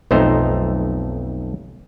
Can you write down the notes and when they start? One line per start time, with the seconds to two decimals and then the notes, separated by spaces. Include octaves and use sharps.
0.11 B1 F2 A3 D#4 C5 A#5